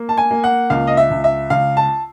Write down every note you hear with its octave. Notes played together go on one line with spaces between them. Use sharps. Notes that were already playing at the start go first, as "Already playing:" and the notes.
Already playing: A#3
A5
G#5
A#3
F#5
C#2 F5
D#5
E5
C#2
E5
C#2 F5
A5